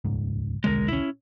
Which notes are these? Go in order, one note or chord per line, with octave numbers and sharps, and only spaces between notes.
D#1 C#2 G#2
D#1 B1 D3 G#3 A#4
C#4 E4